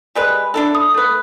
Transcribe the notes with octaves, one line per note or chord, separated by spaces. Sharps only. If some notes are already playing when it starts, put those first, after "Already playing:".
G3 G#3 B4
D4 E4 A4
D#6
A3 B4